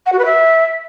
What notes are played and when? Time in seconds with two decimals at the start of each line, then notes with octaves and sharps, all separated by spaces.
0.06 F#5
0.12 F#4
0.19 B4
0.25 E5